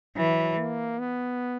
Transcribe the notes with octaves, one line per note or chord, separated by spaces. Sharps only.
E3 F#3
A#3
B3